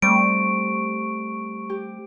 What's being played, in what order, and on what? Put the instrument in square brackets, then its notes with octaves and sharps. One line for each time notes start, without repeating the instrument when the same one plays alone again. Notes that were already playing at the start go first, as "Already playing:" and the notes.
[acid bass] G3 [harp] A3 C4 [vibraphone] C#6 [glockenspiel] D7
[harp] G4